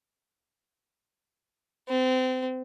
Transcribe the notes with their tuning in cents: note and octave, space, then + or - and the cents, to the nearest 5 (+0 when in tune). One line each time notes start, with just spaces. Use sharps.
C4 -30